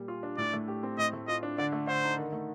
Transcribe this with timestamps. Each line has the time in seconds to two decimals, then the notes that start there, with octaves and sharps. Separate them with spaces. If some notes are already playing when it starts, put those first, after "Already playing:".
Already playing: A#2 G3
0.08 F4
0.23 D4
0.37 A2 D5
0.53 A3
0.68 G4
0.83 C4
0.98 A2 D#5
1.13 A3
1.28 F4 D#5
1.43 D4
1.58 D3 D5
1.72 A3
1.87 D3 C5
2.04 D#4
2.17 D#3
2.33 A3